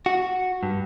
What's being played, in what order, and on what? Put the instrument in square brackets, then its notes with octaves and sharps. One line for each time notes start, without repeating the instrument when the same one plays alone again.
[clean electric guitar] F#4
G2